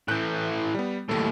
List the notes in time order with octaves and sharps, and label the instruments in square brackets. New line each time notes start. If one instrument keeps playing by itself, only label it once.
[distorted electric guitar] A2 E3 [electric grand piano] F#6 G6
[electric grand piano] G3 B3
[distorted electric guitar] D#2 A2 [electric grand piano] A3 A4